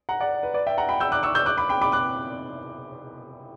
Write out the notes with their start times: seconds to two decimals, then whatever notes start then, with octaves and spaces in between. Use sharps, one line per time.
0.09 F#5 A#5
0.20 D5 F#5
0.43 B4
0.54 B4 D5
0.67 E5 G5
0.78 F#5 A#5
0.89 G5 B5
1.00 E6 G6
1.12 D6 F#6
1.23 C#6 E6
1.35 E6 G6
1.46 D6 F#6
1.57 B5 D6
1.69 G5 B5
1.81 B5 D6
1.92 D6 F#6